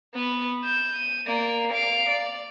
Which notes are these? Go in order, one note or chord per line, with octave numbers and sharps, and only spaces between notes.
B3 B4
G6 E7
D#7
A#3 D5
F5 D7
D5